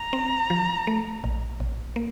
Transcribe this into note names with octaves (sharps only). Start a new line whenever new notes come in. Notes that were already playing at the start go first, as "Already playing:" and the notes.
Already playing: A#5
C4
F3
A3
A#1
A#1
A#3